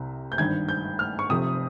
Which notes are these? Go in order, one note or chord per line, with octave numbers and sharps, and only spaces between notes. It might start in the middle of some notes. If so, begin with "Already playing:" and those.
Already playing: C2 C3
G6
G#1 G2 D#3 G#6
G6
F6
C#6
F1 F2 C3 D#6